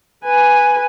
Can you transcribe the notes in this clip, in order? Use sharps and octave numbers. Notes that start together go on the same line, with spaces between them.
B4 G#5